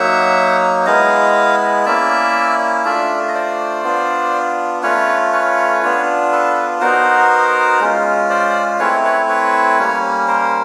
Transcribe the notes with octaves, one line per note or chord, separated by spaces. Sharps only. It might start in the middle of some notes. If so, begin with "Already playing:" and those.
Already playing: F#3 A#3 D#4 E5 F#5
G#3 B3 E4 D#5 F5
A#3 C#4 E4 D5 E5
A3 D4 F4 D5 E5
D#5
C5 D5
B3 D4 F4
A3 C#4 F4 B4 C#5
B4 C#5
B3 D4 F4
A4 B4
B3 D#4 F#4 A#4 C5
G#3 C#4 F4
C5 D5
A3 C4 E4 B4 C#5
B4 C#5
B4 C#5
G3 A#3 C#4
A#4 C5